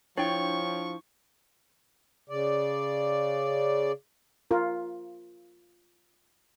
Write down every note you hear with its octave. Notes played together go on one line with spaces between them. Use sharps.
F3 D4 E4 C#5 G5 C#6
C#3 D5
F4 A#4